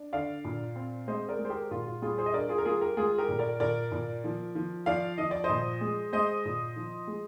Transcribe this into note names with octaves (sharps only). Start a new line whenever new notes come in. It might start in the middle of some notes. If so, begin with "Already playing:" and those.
Already playing: D4
D3 D5 F5
A#2
C4
G#3 C5 D#5
A#4 D5
G#3
C5
G4 A#4
A#2 F4
F4
G3 F4 G#4
G#4 C5
D#5
D4 A#4 D5
F4 G#4
A#4
G3 F4 G#4
G4 A#4
G#3 F4 G#4
G4 A#4
A#2
A#4 D5
A#2 A#4 D5
A#2
F3
F3
F3 D5 F5
F3 D#5
D5
C5 D#5
A#2
G#3
G#3 C5 D#5
A#2
F3
G#3